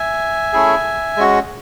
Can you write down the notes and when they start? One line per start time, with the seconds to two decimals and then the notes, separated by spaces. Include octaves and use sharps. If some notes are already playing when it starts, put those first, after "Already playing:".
Already playing: E5 G#5
0.53 A3 C#4 E4 G#4
1.17 G#3 C#4 F#4